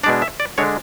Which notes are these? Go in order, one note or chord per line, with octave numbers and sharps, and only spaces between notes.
B2 G#3 D4 D5
E5
D5
D3 G#3 D4 C#5